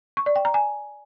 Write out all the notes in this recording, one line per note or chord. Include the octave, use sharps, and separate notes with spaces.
C#6
D5
G5
A#5
G#5